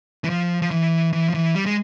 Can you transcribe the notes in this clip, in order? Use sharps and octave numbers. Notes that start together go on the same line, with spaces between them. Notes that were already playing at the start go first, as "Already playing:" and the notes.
E3
F3
F3
E3
E3
F3
E3
G3
G#3